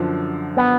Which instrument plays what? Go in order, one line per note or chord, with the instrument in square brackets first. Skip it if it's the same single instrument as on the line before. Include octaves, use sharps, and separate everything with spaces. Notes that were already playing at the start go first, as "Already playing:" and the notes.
Already playing: [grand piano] F#2 D3 F3
[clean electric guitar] B3